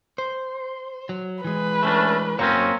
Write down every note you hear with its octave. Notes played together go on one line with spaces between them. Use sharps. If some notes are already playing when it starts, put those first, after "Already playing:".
C5
F#3
E3 G#3 B4
A3 C#4 D4
F#2 F#3 A#3 C4 C#4 C#5